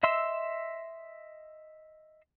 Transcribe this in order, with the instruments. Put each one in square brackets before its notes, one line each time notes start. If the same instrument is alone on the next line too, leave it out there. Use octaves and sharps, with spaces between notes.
[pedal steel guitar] D#5 E5 C6 E6